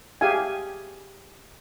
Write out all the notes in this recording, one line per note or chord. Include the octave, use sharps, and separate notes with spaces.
G4 G#4 E5 F5 G#5